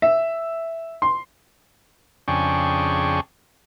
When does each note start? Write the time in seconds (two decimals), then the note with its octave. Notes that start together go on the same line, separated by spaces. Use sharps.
0.02 E5
1.02 C6
2.28 F2 C#3 D4 G#4 G5 C#6